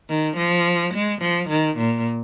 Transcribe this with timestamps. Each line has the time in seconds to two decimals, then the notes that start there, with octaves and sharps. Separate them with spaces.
0.09 D#3
0.37 F3
0.94 G#3
1.21 F3
1.49 D#3
1.77 A#2